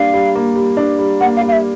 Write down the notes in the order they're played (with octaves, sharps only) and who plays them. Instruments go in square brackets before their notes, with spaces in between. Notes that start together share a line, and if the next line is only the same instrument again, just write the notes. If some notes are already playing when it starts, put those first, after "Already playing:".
Already playing: [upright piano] G3 A#3 D4 [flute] F5
[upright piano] G3
A#3
G3
D4
G3
[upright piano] A#3 [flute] F#5
[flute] F5
[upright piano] G3
[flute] F5
E5